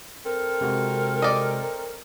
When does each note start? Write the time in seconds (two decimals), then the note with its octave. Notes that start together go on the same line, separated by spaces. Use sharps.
0.25 C4 A4 A#4
0.61 C3 G#3 F#4
1.22 D5 D#5